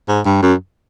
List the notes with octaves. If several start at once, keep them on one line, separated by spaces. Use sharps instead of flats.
G#2
G2
F#2